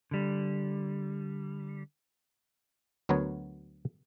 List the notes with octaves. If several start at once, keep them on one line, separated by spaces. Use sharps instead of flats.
D3 G3
D2 F#3 B3 A#4 C#5